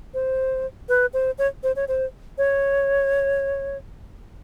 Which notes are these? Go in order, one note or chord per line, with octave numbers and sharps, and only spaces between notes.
C5
B4
C5
C#5
C5
C#5
C5
C#5